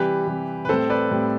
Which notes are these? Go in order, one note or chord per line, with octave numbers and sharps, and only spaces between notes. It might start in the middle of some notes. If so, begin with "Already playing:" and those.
Already playing: C3 E3 G3 G4 B4
C3 E3 G3
B4
A2 G3 C4 A4 C5
B4 D5
A2 G3 C4